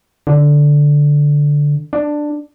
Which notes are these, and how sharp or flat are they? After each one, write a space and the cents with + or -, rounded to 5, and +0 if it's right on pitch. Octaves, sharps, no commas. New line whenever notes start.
D3 -5
D4 +10